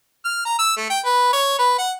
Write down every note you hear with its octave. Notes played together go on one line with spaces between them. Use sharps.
F6
A#5
E6
A3
G5
B4
C#5
B4
F#5